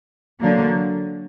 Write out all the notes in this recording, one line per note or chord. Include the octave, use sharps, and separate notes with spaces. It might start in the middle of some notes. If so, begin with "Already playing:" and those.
D3 F#3 A#3